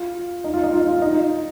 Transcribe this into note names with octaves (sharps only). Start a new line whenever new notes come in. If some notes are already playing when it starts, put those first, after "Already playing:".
Already playing: F4
D#4
F4
D#4
F4
F4
D#4